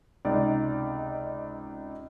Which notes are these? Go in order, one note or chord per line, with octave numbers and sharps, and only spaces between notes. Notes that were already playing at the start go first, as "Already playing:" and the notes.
C#2 C3 D#4 D5